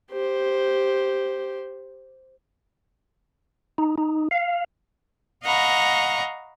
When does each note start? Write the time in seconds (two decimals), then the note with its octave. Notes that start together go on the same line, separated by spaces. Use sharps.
0.11 G4 C5
3.78 D#4
3.98 D#4
4.31 F5
5.44 D#5 F5 F#5 A#5 B5 C#6